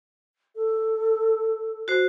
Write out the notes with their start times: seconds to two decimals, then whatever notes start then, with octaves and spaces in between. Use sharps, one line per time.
0.55 A4
1.88 F#4 C5